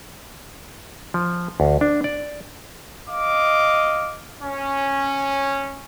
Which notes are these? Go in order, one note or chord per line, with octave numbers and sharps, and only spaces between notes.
F3
D2
D4
D5
D#5 F5 D6
C#4